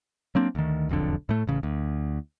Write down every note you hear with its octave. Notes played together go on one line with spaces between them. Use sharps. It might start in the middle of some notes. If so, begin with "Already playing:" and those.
F#3 A#3 C4 D4
D2 D#3
E1 B1 F2 D3
A2 A3
A1 C#3
D2